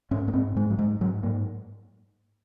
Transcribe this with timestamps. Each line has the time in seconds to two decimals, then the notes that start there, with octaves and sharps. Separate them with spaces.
0.11 G#2 C#4
0.28 A#3
0.34 G#2 C4
0.56 G#2 G#3
0.70 F#3
0.79 G#2 G#3
1.01 G#2 F#3
1.23 G#2 A#3